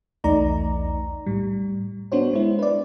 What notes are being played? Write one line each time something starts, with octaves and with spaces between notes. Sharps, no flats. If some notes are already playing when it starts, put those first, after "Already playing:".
B1 E2 A3 D#4 D5 A#5
A2 G3
B3 D4 F#4 C5 C#5
G#3 E4
B4 D5